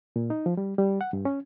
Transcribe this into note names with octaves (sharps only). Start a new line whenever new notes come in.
A#2
D#4
F3
G3
G3
F#5
G2
C#4